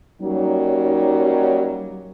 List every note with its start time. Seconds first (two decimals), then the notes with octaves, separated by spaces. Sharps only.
0.21 F#3 G3 A#3 C#4 D#4